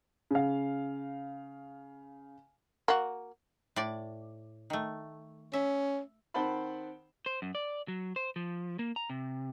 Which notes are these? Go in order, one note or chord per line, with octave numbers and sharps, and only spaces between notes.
C#3 F5
A#3 F#4
A2 D5
D#3 A3
C#4 E5
D#3 C4 C5 F#5 A5 B5
C5
F#2
D5
F#3
C5
F3
A#3
A#5
C3